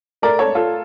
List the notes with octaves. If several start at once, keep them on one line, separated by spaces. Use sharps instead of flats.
A3 A#4 D5
A4 C#5
A3
F4 A4